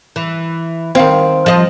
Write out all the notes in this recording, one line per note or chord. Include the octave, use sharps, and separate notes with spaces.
E3
D#3 C4 F5
F3 D#5